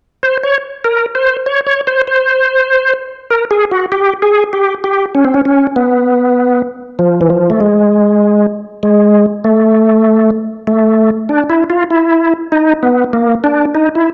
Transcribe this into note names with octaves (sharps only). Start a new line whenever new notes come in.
C5
C#5
A#4
C5
C#5
C#5
C5
C5
A#4
G#4
F#4
G4
G#4
G4
G4
C#4
C4
C#4
C#4
B3
F3
E3
F3
A3
G#3
G#3
A3
A3
D4
E4
F4
E4
D#4
B3
A#3
D4
D#4
E4